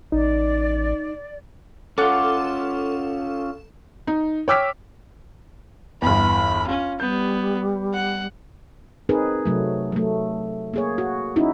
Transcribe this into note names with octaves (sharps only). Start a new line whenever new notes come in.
A1 D#4 D5
C#4 F4 A4 F#5 D6
D#4
C#5 G5 D6 E6 F6 B6
G1 E2 B5
C#4 F4
G3 B3 G6
F#5
C4 D#4 G#4 A#4 B4
C3 F#3 A3
F#3 A3
A#3 G#4 C#5
F#4
C#4 D#4 E4 F#4